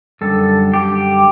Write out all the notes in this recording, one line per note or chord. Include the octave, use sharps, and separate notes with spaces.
F#2 D3 G3 A4
G4